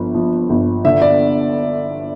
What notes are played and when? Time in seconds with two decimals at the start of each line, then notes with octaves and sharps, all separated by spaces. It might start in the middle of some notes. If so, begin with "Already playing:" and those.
Already playing: G1 F3
0.15 F3
0.50 G1
0.85 D3 E5
1.02 D5